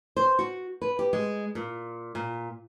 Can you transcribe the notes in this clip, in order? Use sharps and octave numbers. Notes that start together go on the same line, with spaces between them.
C5
F#4
B4
G4
G#3
A#2
A#2